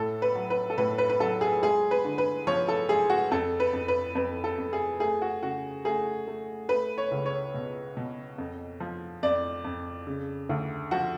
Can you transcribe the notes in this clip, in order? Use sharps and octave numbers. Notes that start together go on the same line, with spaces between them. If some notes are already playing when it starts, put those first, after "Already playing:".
Already playing: A2 A4
B4
F#3
B4
A4
A2 B4
B4
B4
F#3 A4
G#4
G#3 G#4
B4
D3
B4
F3 C#5
A4
G#3 G#4
F#4
F2 A4
B4
F2
B4
F2 B4
A4
F2
G#4
A3 G#4
F#4
C#3 F#4
A3 G#4
A3
A3 B4
C#5
C#2
C#5
B2
B2
F2
F3
F2 D5
F2
C#3
D2
F3 F#4